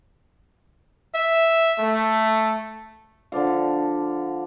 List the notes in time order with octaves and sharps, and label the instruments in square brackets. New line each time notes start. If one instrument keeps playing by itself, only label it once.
[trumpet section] E5
A3
[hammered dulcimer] D3 F3 D5 F5